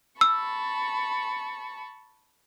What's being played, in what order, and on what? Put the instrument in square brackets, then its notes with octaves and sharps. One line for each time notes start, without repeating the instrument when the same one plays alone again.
[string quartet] A5 B5 C#6 [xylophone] E6